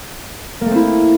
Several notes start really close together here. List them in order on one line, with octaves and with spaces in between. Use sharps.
A#3 A3 C4 E4